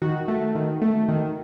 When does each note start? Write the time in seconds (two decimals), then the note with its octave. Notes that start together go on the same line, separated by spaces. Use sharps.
0.02 D#3 F#4
0.28 A3
0.55 D#3
0.82 A3
1.09 D#3